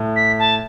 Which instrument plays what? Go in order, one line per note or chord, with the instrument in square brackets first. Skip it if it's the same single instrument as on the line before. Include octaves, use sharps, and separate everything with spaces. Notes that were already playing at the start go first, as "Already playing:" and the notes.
Already playing: [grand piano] A2
[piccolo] B6
A5